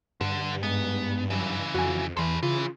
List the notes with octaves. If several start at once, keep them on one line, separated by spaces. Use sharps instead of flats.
G2 D3
G#2 B3
F#2 C#3 E3
F2 F#4 G#5
E2 E3 A4 B4 C6
C#3 E3 F4